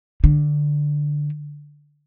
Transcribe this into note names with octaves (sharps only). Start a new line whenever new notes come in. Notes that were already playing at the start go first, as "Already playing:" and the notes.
D3